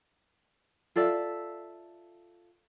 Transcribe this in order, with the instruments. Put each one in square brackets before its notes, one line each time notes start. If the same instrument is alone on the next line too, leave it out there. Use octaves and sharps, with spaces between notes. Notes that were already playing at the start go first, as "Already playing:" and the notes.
[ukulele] F4 A4 D5 E5